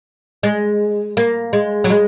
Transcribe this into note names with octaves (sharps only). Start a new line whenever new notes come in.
G#3
A#3
G#3
F#3
G#3